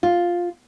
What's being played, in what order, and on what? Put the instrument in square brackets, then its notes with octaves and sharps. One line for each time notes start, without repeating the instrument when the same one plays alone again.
[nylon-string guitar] F4